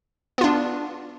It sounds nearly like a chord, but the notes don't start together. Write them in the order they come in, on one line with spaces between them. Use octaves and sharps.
B3 F4 D4